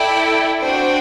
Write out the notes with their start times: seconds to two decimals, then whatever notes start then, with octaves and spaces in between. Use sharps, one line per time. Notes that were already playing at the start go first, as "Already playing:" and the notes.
Already playing: E4 A4 D5 G5
0.63 D4 F#4 C5 G5